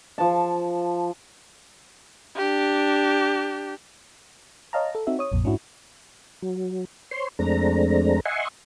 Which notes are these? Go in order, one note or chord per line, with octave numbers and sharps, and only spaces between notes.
F3 A5
D4 G4
C#5 D#5 F5 A5 A#5
A4
C4 D#4 F#4 E5
C#5 D#6
A#1 F2 A#2
G#2 C#4 D4 E4 F#4
F#3
C5 C#5 C6
F2 G#3 A3 C4 D4 A#5
D#5 E5 F#5 G#5 C6 C#6